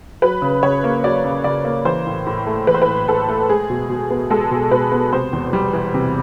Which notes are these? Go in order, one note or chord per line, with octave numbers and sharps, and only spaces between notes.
F#3 B4
C#3
C#3 C#5
A#3
F#3 D5
C#3
C#3 D5
A#3
E3 C5
A2
A2
A3
E3 B4
C5
B4
A2
A2 A4
A3
G#3 G#4
B2
B2
B3
G#3 A4
B2
B2 B4
B3
C3 C5
E2
G3
E3
C3